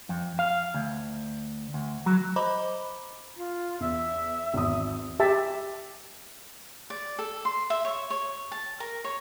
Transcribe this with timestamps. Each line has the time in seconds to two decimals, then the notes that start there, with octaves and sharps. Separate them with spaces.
0.09 F2
0.39 F5
0.74 D2
1.74 D2
2.06 F#3
2.36 C5 D#5 A#5 B5 D6
3.37 F4
3.80 E2 E5
4.54 G#1 E2 D#6
5.20 G4 E5 A5
6.90 D5
7.19 A4
7.45 C6
7.70 E5
7.85 C#5
8.10 C#5
8.52 A5
8.80 A#4
9.04 C#5